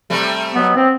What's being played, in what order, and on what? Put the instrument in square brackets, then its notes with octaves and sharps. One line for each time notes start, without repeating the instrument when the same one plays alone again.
[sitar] C3 G3 A3
[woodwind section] B2 F#3 B3
C4